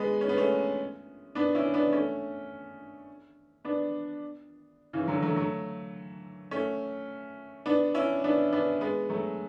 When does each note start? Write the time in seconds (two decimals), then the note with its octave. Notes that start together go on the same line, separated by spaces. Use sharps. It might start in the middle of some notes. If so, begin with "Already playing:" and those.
Already playing: G#3 B3
0.21 C#4
0.29 B3
0.37 A3 C#4
1.35 B3 D4
1.55 C#4 E4
1.74 B3 D4
1.93 A3 C#4
3.65 B3 D4
4.93 C#3 E3
5.08 D3 F#3
5.23 F#3 A3
5.36 F#3 A3
6.51 A3 C#4
7.66 B3 D4
7.94 C#4 E4
8.24 B3 D4
8.52 B3 D4
8.81 G#3 B3
9.10 F#3 A3